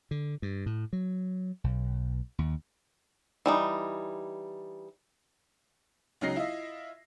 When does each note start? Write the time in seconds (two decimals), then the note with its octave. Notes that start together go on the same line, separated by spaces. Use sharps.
0.11 D3
0.42 G2
0.66 A2
0.93 F#3
1.64 B1
2.39 D#2
3.46 E3 G3 D#4
6.21 C#2 C#3 F#3 D#4 A#6 C7
6.36 E4 F4 D#5 E5